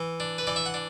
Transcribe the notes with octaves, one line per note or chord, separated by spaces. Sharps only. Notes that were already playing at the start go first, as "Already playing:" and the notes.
Already playing: E3
D4
B4
E3 D5
E5
F#5
D4